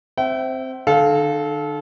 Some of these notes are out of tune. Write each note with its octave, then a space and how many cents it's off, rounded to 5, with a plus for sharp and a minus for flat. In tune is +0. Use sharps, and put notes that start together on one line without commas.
C4 +0 E5 +0 G5 -45
D3 +45 A4 -25 F5 +0